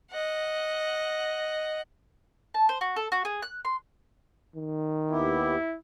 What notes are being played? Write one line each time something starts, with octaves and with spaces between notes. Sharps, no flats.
D#5 F#5
A5
C5
F#4
A4
F#4
G#4
F#6
C6
D#3
D#2 B3 E4 G4